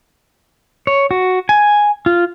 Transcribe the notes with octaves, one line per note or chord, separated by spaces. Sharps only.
C#5
F#4
G#5
F4